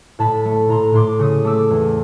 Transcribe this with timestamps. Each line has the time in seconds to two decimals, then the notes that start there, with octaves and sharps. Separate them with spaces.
0.19 A2 A5 B5
0.45 A3
0.69 A2 A#5 C6
0.94 A2 C6 D6
1.19 C#3 C#6 D#6
1.44 A3 D6 E6
1.71 E2